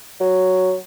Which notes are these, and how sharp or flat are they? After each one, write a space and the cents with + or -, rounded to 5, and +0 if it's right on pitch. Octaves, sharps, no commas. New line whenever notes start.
F#3 +0